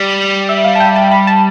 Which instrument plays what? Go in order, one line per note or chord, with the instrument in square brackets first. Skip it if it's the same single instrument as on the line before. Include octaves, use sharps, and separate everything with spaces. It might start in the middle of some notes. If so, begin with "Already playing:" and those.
Already playing: [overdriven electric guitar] G3
[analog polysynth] E5
F5
A5
G5
A5
B5
A5